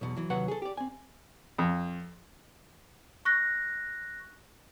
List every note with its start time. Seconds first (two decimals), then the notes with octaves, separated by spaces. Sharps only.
0.01 B1 E2 B2
0.16 E3 F#3
0.30 D#2 C3 F#3 B4 F#5
0.48 G#4 A4
0.62 G4 D5
0.77 C4 G#5
1.58 F2
3.25 C#6 F#6 A#6